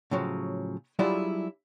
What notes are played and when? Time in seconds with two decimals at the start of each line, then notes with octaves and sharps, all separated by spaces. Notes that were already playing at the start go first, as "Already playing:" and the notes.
0.11 A2 C#3 F3 F#3
0.99 F#3 G3 D4 E4 F4 G#4